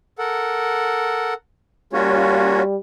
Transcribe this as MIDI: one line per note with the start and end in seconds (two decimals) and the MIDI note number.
0.19 1.34 69
0.19 1.34 70
0.19 1.34 78
1.93 2.77 55
1.93 2.61 58
1.93 2.63 61
1.93 2.63 65
1.93 2.63 66
1.93 2.61 73